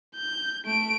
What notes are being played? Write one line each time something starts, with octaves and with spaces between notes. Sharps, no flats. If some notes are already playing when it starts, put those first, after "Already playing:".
G6
A3 D7